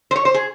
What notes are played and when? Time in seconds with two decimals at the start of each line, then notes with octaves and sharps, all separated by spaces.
0.11 C5
0.16 C#5
0.25 C5
0.34 G#4